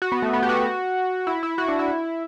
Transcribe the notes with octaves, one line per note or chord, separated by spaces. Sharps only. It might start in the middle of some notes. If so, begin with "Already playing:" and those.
F#4
B3
A3
B3
G4
F#4
E4
E4
F#4
D4
E4